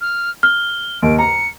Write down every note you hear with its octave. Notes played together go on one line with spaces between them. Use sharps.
F6
F6 G7
D#2 D7
A#5 C#7